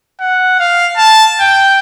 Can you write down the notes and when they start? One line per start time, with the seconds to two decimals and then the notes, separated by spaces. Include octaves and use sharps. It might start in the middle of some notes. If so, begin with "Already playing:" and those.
0.20 F#5
0.60 F5
0.97 A5
1.40 G5